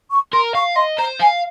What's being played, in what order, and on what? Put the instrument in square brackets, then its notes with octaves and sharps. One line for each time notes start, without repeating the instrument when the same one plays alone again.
[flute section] C#6
[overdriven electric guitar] A#4 [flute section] C6
[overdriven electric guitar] F5 [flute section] C#6
[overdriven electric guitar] D#5 [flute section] C6
[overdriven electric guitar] C5 [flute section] A#5
[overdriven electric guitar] F5 [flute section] G#5